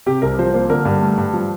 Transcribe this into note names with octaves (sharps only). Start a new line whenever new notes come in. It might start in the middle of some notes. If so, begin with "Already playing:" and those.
C3 G4
C2 A#4
F3 C5
A#3 C5
D3 A#4
G2
A3
G2
F3